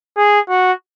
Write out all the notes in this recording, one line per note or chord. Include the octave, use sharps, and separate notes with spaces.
G#4
F#4